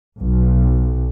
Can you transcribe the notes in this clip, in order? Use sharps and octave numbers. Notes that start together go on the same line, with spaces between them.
B1